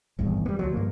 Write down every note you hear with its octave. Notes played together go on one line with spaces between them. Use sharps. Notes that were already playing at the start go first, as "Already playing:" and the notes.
D#1 G#1 E2 G2
G3 A#3
D2 F3 F#3
G2 A#3